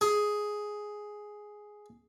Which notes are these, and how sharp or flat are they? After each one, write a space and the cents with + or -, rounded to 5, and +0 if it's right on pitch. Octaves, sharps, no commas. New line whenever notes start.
G#4 +5